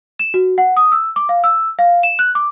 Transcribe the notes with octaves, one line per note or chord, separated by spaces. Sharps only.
E7
F#4
F#5
D#6
E6
D6
F5
E6
F5
E7
F#6
D6